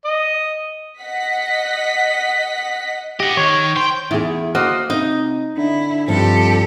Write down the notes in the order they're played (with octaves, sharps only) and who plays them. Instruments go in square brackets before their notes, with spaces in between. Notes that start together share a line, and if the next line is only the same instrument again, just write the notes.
[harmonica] D#5
[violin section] D#5 F#5 B6
[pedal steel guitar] G4 [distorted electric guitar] D#5 F#5
[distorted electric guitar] D#3 [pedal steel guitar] C#5
[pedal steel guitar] C5 [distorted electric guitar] G5
[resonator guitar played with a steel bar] E2 [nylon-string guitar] E4 G#4
[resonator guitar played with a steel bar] A#3 F#4 D#5 [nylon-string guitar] C5
[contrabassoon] C3 [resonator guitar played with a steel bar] D#4 [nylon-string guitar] D#5
[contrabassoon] D3 [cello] E4
[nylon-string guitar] G2 F3 [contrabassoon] C3 [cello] G4 A4